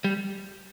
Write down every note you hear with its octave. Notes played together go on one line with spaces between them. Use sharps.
G3